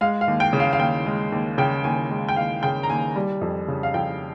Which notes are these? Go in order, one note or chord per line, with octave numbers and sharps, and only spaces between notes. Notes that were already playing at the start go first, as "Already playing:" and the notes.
G#3 F5
F5
D#2
G5
C#3
F5
F5
D#2 G5
G#3
D#2
C#3 G5
D#2 G#5
G#3
G5
D#2 F5
C#3 G5
A#5
D#2 G#5
G3
F2
C#3
F5
F2 G5